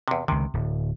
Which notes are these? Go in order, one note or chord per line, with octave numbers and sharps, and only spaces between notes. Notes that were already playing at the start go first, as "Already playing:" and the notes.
E2 C3
C#2 C3 D#3
D1